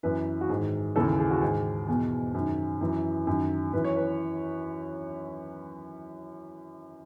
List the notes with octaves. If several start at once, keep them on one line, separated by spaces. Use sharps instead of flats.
F#2 E3 B4
F#4
G#2 D#3 G#4
D#2 C#3 E3 A4
G#4
G#4
F#4
G#2 D#3 G#4
E2 B2 G#4
F#2 D#3
F#2 E3
F#2 D#3
F#2 E3 B4
C#5
B4